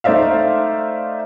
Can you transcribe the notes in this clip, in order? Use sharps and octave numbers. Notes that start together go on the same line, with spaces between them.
A3 D#4 C5 D5 E5 F5